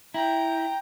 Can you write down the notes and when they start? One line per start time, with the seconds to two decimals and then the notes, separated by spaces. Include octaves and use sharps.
0.14 E4 G5 A#5